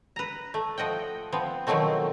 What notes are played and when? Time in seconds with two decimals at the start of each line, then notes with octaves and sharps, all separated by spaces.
0.16 B4 A#5
0.54 A3
0.78 F3 D#5 F#5 G5
1.32 F3 B3 C4
1.67 B2 D#3 F3 F#3 A3 C4